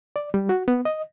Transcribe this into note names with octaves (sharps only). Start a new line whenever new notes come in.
D5
G3
F#4
B3
D#5